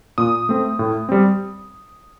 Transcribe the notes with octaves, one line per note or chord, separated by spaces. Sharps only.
A#2 D#6
A3 C4
A2
G3 C4